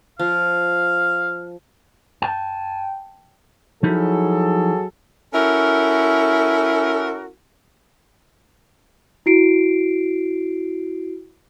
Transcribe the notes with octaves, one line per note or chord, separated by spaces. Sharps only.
F3 F5
G5 A5
F3 F#3 D#4 E4 G#4 A4
C#4 E4 F#4 A4 A#4
E4 F#4 C7 D7